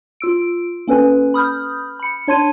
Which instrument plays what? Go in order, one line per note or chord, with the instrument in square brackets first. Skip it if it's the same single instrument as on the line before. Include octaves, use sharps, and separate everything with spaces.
[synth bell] F4 E6 D7
A#3 C#4 A4 B4 G#5
B5 D#6 F6 G6
B5 C#7
D4 C#5 A5 C6 G#6 D#7